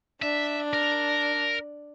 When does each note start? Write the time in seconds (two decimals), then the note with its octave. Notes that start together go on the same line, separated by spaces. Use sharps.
0.22 D4 E5
0.73 A#4